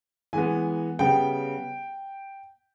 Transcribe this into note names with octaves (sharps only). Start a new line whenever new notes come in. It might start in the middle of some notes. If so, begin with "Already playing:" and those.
E3 G#3 B3 G#5
C#3 G3 B3 G5